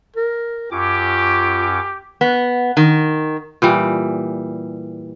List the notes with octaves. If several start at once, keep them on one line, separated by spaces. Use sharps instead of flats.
A#4
F#2 C#4 F4 G4 D6
B3
D#3
A#2 E3 G3